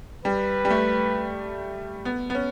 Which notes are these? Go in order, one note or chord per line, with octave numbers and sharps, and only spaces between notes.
G3 B4
G3
A3
B3
B3
C#4